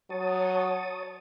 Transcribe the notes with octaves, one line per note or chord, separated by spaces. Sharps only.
F#3 C#5 A5 D#6